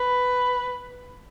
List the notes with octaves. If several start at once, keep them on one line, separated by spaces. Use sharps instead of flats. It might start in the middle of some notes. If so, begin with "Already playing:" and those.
Already playing: B4